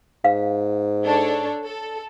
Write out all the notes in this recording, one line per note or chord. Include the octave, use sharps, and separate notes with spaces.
G#2 F5
D4 A4 C#5
A4